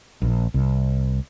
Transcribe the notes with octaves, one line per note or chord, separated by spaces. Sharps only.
A#1
C2